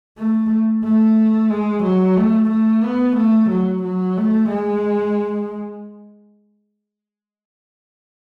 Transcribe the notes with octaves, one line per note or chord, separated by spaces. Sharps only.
A3
A3
G#3
F#3
A3
A3
B3
A3
F#3
F#3
A3
G#3